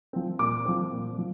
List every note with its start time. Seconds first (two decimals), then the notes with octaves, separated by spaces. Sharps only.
0.13 F3 C4
0.39 A#2 D6
0.65 F3 C4
0.92 A#2
1.18 F3